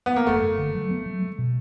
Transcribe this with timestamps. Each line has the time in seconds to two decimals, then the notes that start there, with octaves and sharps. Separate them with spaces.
0.06 B3
0.16 A#3
0.27 F#1 A3
0.42 F#1
0.58 D3
0.75 F#3
0.91 B3
1.06 F#3
1.22 G#3
1.38 B2